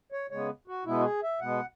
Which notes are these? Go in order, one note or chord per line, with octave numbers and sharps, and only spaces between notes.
C#5
C#3 G#3 B3 C#5
F#4
B2 G#3 B3 E4
F#4
G#4
E5
B2 G#3 B3 F#5